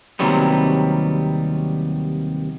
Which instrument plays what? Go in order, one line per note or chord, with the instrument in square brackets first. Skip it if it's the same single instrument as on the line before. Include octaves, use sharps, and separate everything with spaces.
[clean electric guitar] D#2 C3 F#3 G3 B3